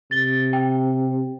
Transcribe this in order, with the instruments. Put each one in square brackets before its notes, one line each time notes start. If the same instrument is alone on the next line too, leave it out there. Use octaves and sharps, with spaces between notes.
[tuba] C3 [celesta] A6 G7
[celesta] G5